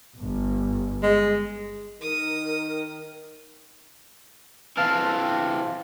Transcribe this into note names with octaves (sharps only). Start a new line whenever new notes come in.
G1
G#3
D#3 A#4 D#6
E3 C4 F5 A5 F6